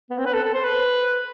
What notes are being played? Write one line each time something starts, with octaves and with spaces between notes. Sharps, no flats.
B3
C4
B4
A4
A4
C5
B4